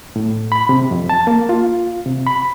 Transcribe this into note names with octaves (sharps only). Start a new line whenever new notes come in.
A2
B5
C3
F2
A5
A#3
F4
C3
B5